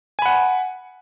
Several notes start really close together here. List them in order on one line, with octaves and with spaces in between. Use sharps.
G#5 B5 F#5